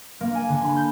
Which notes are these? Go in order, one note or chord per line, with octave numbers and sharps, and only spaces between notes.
A#3
G#5
D3
B5
G6